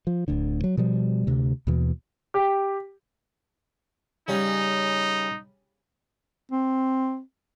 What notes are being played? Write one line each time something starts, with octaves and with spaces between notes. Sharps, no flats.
F3
D1 D2 D3
F#3
B2 F3 G3
D2 C3
D#2 B2 E3
G4
C#3 G3 C#4 D#4
C4